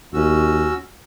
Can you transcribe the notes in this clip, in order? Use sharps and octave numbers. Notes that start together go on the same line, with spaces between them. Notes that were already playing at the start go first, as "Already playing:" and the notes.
D#2 C#4 F#4 E6